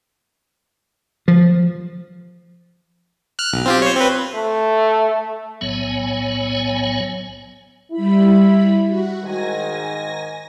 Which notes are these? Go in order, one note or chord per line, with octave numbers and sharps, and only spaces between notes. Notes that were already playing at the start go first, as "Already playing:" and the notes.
F3
F6 F#6
B1
C4 F4 G4
C5 C#5
C4 B4
A3
B1 A2 F#3 B3 C#5 G#5
G3 E4 B5
F#4
G#2 D#3 G#5 A#6